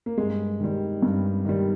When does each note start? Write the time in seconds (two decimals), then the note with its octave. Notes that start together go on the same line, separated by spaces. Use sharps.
0.06 A#3
0.18 G2 G#3
0.60 D#3 G3
1.02 G2
1.45 D#3 G3